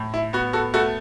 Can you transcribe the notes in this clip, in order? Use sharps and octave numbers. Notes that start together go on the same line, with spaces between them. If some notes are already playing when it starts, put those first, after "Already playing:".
Already playing: A2
E4
B3 F#4
F#4 A4
A3 F#4 A4